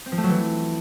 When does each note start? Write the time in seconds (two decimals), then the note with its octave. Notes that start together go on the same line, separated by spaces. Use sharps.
0.06 C4
0.12 F3
0.18 A3
0.24 F#3
0.29 E3